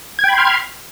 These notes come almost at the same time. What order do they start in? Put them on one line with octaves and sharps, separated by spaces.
G#6 G5 B5 C6 F6